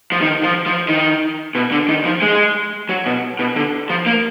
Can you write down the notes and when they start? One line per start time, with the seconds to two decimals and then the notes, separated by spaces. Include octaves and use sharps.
0.12 F3
0.21 D#3
0.43 F3
0.66 F3
0.88 D#3
1.55 B2
1.72 D3
1.89 D#3
2.05 F3
2.22 G#3
2.89 F#3
3.06 B2
3.39 B2
3.56 D3
3.90 F3
4.06 A#3